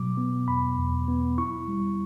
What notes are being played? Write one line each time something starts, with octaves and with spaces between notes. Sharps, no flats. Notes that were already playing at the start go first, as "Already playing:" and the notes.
Already playing: B2 F#3 D6
B3
E2 B5
E2
B3
E4 C#6
G3